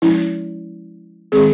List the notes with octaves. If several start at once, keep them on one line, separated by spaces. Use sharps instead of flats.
F3 G#3 C#4 E4
D#3 G#3 C4 G#4